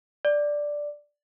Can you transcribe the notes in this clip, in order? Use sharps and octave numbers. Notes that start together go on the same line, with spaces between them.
D5